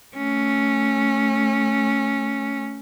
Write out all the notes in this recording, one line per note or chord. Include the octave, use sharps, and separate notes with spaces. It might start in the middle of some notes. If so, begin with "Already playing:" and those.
A3 C#4